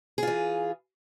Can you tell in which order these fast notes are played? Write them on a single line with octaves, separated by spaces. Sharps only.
G#4 F4 E3